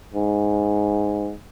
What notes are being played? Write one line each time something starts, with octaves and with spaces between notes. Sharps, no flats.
G#2